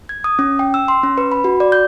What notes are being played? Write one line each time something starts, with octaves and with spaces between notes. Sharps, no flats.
G#6
D#6
C#4
G5
E6
C6
C#4
B4
B5
F#4
D5
G6